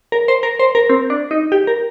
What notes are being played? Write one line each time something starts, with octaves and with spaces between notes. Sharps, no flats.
A#4
C5
A#4
C5
A#4
C4
D4
D#4
G4
A#4